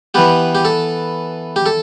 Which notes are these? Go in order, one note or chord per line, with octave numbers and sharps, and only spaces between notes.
E3 B3 G4
G4
A4
G4
A4